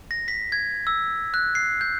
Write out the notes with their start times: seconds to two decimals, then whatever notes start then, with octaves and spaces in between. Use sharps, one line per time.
0.11 A#6
0.28 B6
0.52 G#6
0.87 E6
1.34 F#6
1.55 C7
1.81 G6